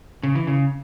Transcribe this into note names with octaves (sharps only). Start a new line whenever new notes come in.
C#3
E3
C#3